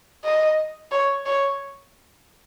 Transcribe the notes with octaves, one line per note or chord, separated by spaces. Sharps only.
D#5
C#5
C#5